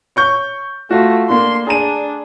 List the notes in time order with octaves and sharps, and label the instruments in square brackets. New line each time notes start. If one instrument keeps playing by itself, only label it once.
[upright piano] C#5 C#6 G6
[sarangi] A3 [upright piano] F4 F#4
[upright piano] A#3 D4 [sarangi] C6
[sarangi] D4 [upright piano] G#4 A#5 D#7